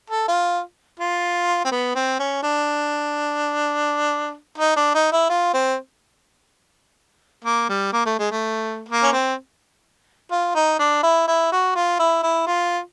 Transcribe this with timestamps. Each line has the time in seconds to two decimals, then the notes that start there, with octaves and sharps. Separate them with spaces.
0.10 A4
0.28 F4
0.99 F4
1.65 C4
1.71 B3
1.95 C4
2.19 C#4
2.43 D4
4.58 D#4
4.76 D4
4.94 D#4
5.12 E4
5.29 F4
5.54 C4
7.45 A#3
7.69 G3
7.92 A#3
8.05 A3
8.19 G#3
8.32 A3
8.88 A#3
9.03 C#4
9.13 C4
10.32 F4
10.55 D#4
10.79 D4
11.03 E4
11.28 E4
11.52 F#4
11.75 F4
11.99 E4
12.23 E4
12.47 F4